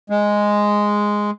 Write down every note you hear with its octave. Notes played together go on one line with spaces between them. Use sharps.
G#3